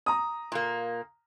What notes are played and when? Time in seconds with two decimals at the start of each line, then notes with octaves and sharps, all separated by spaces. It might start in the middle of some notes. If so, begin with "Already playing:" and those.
0.06 A#5 D#6
0.52 A#2 A#3